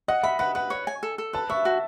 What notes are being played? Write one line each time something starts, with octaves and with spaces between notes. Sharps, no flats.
D#5 F#5
E5 B5
B4 F#5
B4 F#5
C#5
G#5
A4
A4
B4 A5
E5 C#6
F#4